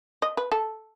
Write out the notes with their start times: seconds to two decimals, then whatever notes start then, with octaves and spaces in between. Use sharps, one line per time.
0.22 D#5
0.37 B4
0.52 A4